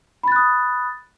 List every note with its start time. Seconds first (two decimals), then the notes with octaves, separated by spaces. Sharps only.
0.23 B5
0.28 A6
0.32 F#6
0.36 D#6